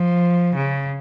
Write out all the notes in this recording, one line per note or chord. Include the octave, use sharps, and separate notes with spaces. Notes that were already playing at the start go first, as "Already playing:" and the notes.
Already playing: F3
C#3